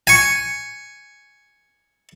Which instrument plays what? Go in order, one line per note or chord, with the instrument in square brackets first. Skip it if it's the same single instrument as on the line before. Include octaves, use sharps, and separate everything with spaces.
[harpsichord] G#5 C#6